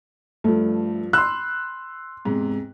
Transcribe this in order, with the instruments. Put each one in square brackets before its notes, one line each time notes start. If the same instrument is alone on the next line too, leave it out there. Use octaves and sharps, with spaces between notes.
[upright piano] G2 F3 [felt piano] A3
[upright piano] B5 E6 [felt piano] C6 F#6
[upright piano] E2 G#2 C3